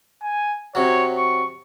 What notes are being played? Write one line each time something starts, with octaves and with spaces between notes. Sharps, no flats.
G#5
C3 F#3 C#5
C#6